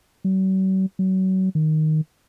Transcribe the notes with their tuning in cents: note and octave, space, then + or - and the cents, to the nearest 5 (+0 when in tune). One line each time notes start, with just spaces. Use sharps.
F#3 +45
F#3 +30
D#3 +0